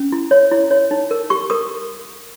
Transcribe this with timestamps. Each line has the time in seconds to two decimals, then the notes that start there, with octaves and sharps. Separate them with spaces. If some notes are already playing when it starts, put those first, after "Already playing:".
Already playing: C#4
0.12 E4
0.31 C#5
0.51 E4
0.71 C#5
0.91 D#4
1.11 A#4
1.30 G4 C#6
1.50 A#4 D#6